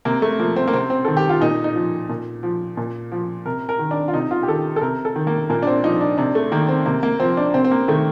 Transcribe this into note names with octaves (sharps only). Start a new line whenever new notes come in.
C3 A#3
A3
F3 A#3
C4
A#3
C3 C4
C4
D#3 A4
G4
F4
A#2 D#4
D#4
F3
A#2
F3
A#2
F3
C3 A#4
A#4
D#3
D4
F4
C3 D#4
F4
G4
D#3 A4
A4
C3 A#4
A4
D#3
A#3
A#2 A#3
D4
C4
F3 D#4
D4
C3 D4
A3
D#3 A#3
C4
C3 A#3
A#3
F3 C4
D4
C3 C4
C4
A#3
D#3 A3